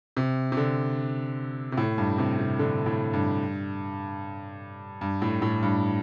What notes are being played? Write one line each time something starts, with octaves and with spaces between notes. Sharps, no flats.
C3
C3
D3
C3
A2
G2
C3
C3
D3
A2
G2
G2
A2
A2
G2